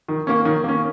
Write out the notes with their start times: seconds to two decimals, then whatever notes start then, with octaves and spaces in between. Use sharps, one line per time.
0.08 D#3
0.27 A#3 C#4
0.45 D#3
0.64 A#3 C#4